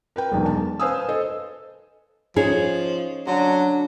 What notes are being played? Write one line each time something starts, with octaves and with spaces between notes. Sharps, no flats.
A#4 B4 G5
E1 B1 B2
A5
B4 C5 F5 G#5 D#6 E6
A4 C5 D#5
F3 C#4 D#4 G#4
D3 F#3